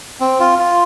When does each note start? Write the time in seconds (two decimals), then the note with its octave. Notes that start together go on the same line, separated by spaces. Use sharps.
0.20 C4
0.40 F4
0.59 F4